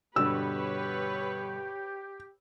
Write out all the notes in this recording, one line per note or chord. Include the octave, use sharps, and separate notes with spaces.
G2 B2 D3 G4 B4 C#5 E6